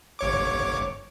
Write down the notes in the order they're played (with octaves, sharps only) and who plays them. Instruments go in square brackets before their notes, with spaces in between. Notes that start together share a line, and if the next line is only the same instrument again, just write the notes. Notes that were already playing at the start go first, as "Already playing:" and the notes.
[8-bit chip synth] G1 C#5 D6